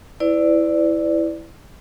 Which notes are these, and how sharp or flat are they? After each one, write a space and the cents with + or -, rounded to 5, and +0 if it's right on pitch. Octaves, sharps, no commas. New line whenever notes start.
E4 +0 B4 +45 D5 +0